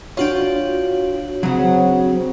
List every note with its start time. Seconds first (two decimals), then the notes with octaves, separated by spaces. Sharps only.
0.17 D4 F4 F#4 C#5 G5
1.43 C#3 F#3 C4 F#5